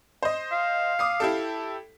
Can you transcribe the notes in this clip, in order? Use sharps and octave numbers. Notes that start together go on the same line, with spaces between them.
C5 D#5
F5
D6 D#6 C7
E4 G4 A4